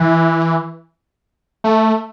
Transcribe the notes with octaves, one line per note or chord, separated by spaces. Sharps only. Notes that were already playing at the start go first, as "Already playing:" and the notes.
Already playing: E3
A3